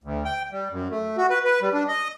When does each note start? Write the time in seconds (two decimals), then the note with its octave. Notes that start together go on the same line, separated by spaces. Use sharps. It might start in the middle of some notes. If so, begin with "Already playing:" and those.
0.04 D2
0.25 G5
0.52 G3
0.71 F#2
0.91 A3
1.17 F#4
1.30 B4
1.45 B4
1.62 G3
1.73 D4
1.88 D#5